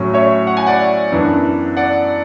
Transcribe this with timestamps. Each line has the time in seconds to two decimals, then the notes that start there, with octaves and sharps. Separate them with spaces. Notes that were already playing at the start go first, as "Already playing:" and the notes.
Already playing: A2 F#3 C#4
0.13 C#5 E5
0.47 F#5
0.57 G#5
0.67 D5 F#5
1.12 F#2 E3 B3 D4
1.77 D5 F#5